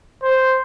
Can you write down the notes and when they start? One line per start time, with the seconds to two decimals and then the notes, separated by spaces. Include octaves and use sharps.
0.23 C5